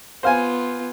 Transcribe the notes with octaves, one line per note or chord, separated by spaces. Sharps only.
B3 F4 C5 F5 G#5